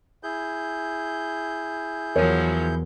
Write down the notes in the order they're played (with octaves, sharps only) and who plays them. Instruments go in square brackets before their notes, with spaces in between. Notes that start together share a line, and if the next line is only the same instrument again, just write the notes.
[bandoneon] E4 G#4 G6
[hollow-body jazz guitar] E2 [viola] F3 F#3 [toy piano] A#4 C#5